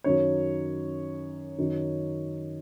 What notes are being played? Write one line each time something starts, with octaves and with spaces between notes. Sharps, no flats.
F#2 D#3 C#5
F#2 D#3